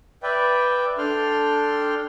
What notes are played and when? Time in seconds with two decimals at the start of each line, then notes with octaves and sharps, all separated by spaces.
0.23 B4 D5 E5 G5
0.98 D4 A4 G5 C6 F6